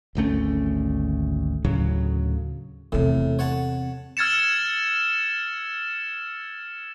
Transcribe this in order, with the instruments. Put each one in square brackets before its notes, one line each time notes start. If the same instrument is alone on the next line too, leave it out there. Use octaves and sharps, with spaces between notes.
[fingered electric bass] G#1 D2 A3 C#4
D2 A2 C#3 F#3
[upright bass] E2 C3 [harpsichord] A2
[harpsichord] C#5 F#5 A5
[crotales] E6 F6 G#6 A6 C#7 E7